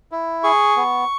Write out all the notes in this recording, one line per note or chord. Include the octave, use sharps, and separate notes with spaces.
E4
G#4 C#6
B3